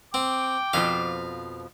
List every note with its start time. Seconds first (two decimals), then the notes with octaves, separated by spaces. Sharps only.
0.14 C4 G5 D6
0.73 F2 B2 F3 F5